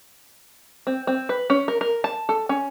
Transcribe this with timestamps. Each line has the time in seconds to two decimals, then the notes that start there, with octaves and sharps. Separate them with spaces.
0.87 C4
1.07 C4
1.29 B4
1.50 C#4
1.68 A#4
1.81 A#4
2.04 A5
2.29 A4
2.49 C#4